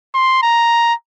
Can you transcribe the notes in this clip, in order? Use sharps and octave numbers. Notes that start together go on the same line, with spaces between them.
C6
A#5